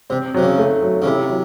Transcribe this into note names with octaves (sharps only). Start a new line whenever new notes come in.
C3 C4
C3 F#3
C#3
A3
F#3
C#3
C3 E4
F#3